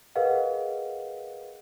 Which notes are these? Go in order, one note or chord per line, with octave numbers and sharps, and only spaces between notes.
G#4 A#4 B4 D#5 F5 F#5